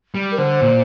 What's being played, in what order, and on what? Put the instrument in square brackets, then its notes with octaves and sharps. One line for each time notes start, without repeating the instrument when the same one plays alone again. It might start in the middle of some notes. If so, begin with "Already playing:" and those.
[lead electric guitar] G3
[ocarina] A#4
[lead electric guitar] D3 [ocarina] C5
[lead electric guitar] A#2